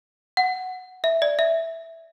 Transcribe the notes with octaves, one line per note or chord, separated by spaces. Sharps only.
F#5
E5
D5
E5